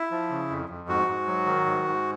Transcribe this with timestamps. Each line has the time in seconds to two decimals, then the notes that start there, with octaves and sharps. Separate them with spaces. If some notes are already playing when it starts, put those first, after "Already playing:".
Already playing: E4
0.11 F3
0.30 C#3
0.50 F2
0.69 F2
0.88 G#2 F#4
1.08 G#2
1.27 F#3
1.46 D#3
1.66 G#2
1.86 G#2